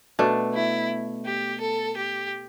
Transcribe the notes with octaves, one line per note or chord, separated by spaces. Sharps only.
B2 A3 D4
E4
G4
A4
G4